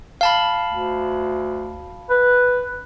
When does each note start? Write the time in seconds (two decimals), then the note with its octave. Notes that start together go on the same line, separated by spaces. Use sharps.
0.21 F5 A5 B5
0.68 D2
2.10 B4